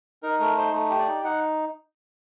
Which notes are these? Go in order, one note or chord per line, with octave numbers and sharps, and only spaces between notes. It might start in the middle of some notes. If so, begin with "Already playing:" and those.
D#4 A#4
A3 A#4
D#4 C5
A3
G4
D5
D#4
D#4 F#5